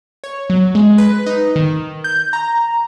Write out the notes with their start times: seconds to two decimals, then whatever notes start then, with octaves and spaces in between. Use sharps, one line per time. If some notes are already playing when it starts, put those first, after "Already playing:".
0.24 C#5
0.50 F#3
0.75 G#3
0.98 B4
1.26 D#4
1.56 D#3
2.04 G6
2.33 A#5